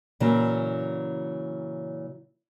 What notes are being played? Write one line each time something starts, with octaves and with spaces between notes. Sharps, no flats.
A#2 C#3 E3 F#3